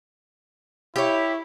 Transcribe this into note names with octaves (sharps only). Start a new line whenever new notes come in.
E4 G4 C#5